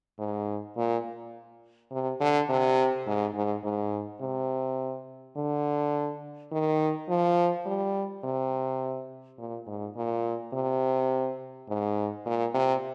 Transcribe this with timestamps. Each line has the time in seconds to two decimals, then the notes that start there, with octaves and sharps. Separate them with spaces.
0.19 G#2
0.77 A#2
1.91 C3
2.20 D3
2.49 C3
3.06 G#2
3.35 G#2
3.64 G#2
4.21 C3
5.37 D3
6.52 D#3
7.09 F3
7.66 G3
8.24 C3
9.38 A#2
9.67 G#2
9.96 A#2
10.53 C3
11.69 G#2
12.26 A#2
12.54 C3